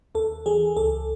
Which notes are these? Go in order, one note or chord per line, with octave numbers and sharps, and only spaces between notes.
D#2 A4
E3 G#4
C#2 A4